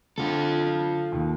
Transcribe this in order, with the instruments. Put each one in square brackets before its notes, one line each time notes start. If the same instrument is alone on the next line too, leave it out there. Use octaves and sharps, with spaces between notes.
[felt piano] D3 [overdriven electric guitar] F4 A4
[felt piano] D#2